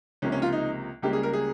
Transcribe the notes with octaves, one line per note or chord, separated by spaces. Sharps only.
C#2 C3 F3 A#3 C#4
C#4
F4
D#4
C#2 C#3 G3 A#3 G4
G#4
A#4
G#4